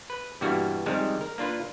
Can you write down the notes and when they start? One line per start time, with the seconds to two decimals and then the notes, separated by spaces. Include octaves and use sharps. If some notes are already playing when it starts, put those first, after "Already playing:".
0.10 B4
0.41 G2 B2 E3 G3 A#3 F#4
0.86 C3 D#3 F3 G3 G#3
1.21 A#4
1.38 A#3 D4 F4 B4